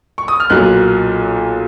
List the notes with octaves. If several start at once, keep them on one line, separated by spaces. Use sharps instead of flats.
C#6
D#6
F6
B1 A#2 F#3 F#6